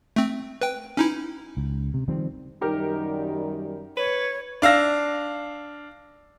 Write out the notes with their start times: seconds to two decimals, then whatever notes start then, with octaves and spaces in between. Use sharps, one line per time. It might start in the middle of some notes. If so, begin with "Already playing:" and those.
0.16 A3 C4
0.61 B4 G5
0.97 C#4 D#4 E4
1.57 C#2
1.94 C3
2.08 D#3 F3 G3 C4
2.61 F#2 D#3 G3 D#4 G4 A#4
3.97 B4 C#5
4.62 D4 F5 E6 A#6